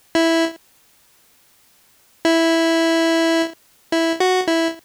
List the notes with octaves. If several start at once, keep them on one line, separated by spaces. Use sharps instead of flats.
E4
E4
E4
F#4
E4